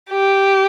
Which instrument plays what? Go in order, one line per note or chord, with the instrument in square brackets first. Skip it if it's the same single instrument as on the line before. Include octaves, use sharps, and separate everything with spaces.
[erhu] G4